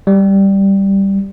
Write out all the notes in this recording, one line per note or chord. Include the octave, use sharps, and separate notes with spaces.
G3